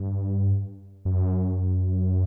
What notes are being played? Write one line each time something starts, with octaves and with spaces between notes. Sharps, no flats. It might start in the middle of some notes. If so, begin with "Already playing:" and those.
Already playing: G2
F#2